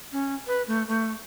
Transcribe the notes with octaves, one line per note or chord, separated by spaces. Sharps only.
C#4
B4
A3
A3